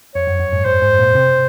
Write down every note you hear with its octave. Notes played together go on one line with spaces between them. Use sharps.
F2 C#5
F#2
F#2
G#2
G#2 C5
G#2
A#2
C3